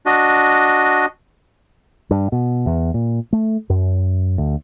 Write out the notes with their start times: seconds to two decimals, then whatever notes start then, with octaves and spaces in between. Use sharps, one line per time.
0.06 D4 F#4 D#5
2.11 G2
2.32 B2
2.66 E2
2.94 A#2
3.33 A3
3.70 F#2
4.38 D2